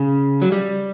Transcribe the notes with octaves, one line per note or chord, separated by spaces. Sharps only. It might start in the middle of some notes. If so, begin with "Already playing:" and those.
Already playing: C#3
F#3
G3